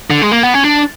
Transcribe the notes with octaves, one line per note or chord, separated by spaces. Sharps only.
D3
G#3
A#3
B3
C#4
D4